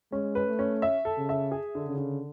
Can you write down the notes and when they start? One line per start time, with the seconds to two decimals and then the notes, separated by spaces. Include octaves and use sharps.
0.12 G#3 C#4
0.35 B4
0.48 A3
0.59 C#4
0.82 E5
1.05 A4
1.17 C#3
1.29 E5
1.52 G#4
1.75 D3
1.86 C#3
1.98 D3